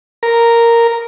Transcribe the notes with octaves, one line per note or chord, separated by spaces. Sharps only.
A#4